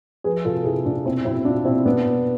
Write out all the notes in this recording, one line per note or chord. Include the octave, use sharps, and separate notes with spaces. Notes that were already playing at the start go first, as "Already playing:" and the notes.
F3 G#4 B4
C3 F4 A4
C3 E4 G#4
C3 D4 F4
B2 C4 E4
B2 C4 E4
B2 D4 F4
B2 C4 E4
B2 B3 D4
B2